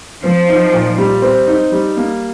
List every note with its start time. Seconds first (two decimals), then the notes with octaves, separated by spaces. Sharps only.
0.23 F3 C4
0.48 D#4
0.73 A#2
0.98 G3
1.22 C4
1.47 D#4
1.72 G3
1.97 A#3